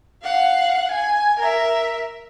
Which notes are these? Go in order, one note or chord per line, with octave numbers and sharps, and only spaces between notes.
F5 F#5
G#5
A#4 E5